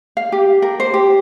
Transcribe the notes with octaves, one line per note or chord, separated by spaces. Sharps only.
F5
G4
A#4
C5
G4